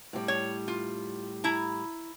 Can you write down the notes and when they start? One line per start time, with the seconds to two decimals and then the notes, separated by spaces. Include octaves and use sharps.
0.13 A2 G3
0.28 C#5
0.68 F4
1.44 E4 A#5